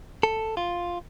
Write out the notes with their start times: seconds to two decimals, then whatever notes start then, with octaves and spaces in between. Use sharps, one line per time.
0.23 A4
0.57 F4